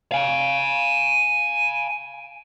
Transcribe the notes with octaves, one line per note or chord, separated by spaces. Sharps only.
F5 G#5